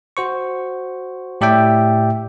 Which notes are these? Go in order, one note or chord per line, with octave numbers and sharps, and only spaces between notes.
F#4 C5 C#6
A2 G4 D5 E5 G5